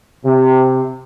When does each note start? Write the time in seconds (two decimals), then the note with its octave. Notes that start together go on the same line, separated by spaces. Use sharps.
0.24 C3